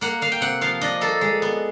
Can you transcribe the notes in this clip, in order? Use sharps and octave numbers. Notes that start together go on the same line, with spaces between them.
A#3 F#5
A#3 F5
G5
C3 F#5
F3 F5
D4 D#5
A#3 A4
G#3
B3